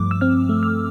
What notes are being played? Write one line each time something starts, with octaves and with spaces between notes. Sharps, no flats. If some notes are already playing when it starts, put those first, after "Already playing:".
Already playing: G2 F3 A3 D6
E6
C4 F6
A3
F6